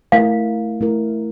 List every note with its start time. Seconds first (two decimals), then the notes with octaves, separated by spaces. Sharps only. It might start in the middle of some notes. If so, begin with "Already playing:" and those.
0.12 A3 E4 A#4 F5
0.81 A3 E4 A#4